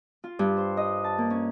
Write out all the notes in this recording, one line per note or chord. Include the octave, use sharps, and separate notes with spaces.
F4
G2
C5
D#5
A5
A#3
C#4